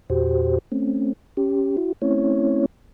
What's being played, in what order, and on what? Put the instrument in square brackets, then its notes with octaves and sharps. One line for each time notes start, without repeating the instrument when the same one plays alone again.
[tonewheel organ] E2 A#2 F#4 G4 C5
A3 C4 C#4
C#4 G4
E4 F#4
A3 C4 C#4 E4 C#5